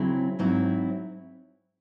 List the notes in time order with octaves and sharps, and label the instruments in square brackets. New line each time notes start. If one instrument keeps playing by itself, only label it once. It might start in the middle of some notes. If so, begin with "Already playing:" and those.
Already playing: [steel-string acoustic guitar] C#3 F#3 C4 E4
G#2 F#3 C4 E4